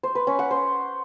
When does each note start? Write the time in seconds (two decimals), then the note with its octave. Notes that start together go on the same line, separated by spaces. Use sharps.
0.03 C5
0.15 B4
0.27 C#4
0.39 F#5
0.51 C5